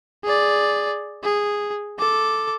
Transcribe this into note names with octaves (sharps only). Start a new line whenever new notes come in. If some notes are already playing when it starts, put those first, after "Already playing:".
G#4 D5
G#4
A4 D6